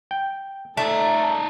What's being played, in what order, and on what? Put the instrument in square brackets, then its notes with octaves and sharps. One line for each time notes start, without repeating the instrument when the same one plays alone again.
[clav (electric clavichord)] G5
[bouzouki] A3 [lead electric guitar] D#4 D5 [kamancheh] A4 A#5 [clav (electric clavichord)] A5